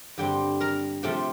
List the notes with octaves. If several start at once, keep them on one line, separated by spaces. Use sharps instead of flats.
G2 D3 G3 C4 G4 G5
A#4 A#5
C3 F3 A3 C4 G4 G5